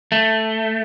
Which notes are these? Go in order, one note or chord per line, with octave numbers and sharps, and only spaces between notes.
A3